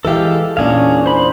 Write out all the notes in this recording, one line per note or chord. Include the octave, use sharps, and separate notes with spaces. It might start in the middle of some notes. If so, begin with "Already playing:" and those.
E3 G#3 G4 A4 F5
E2 A#2 C#4 D4 G#4 F5
C5 B5